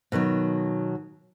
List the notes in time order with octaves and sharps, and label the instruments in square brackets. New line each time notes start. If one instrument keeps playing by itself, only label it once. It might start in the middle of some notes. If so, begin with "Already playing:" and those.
[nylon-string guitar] B2 D#3 F3 F#3